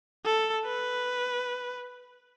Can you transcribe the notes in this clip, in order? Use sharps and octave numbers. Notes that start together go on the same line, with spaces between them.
A4
B4